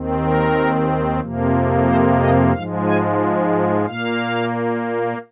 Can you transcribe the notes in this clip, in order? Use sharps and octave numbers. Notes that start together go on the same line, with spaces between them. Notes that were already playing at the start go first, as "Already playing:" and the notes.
Already playing: D#2 D#3 C4
A#4
F2 C3 F3 A#3
C5
D#5
G#2 F3 G#3 F5
G#5
A#2 A#3 F5